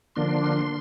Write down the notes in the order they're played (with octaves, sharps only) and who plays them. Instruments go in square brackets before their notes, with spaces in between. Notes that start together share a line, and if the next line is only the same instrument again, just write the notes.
[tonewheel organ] D3 F3 A#3 D4 C6